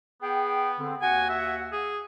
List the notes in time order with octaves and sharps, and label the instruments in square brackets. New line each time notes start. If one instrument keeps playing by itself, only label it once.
[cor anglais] B3 [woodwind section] G#4 G5
[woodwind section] D3 C4
[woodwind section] D#2 F#4 F#5 [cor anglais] G#5
[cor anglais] E5
G#4